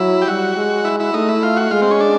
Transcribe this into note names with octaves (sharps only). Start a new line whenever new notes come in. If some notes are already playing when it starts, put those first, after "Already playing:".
Already playing: F#3 E4
G4
G3 F#4
G#3
E4
E4
A3 D#4
E4
F4
F#4
G#3 F4
C4
C#4
D4